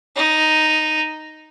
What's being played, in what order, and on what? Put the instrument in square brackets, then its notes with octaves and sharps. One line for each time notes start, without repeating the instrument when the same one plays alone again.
[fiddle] D#4